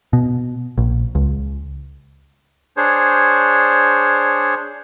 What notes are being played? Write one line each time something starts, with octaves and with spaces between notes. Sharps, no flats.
B2
A#1
C#2
D4 G#4 C5 C#5